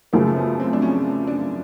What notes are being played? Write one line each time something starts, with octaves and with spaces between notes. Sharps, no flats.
F#2 C#3 F3 A3 A#3
B3
C4
D4
C#4
D4